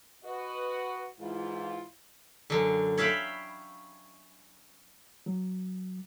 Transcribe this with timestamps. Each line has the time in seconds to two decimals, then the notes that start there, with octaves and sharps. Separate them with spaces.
0.24 F#4 B4 D#5
1.20 G#2 E3 E4 F4
2.50 F#2 D3
2.97 C#5 E5 F5 G5 B5
5.26 F#3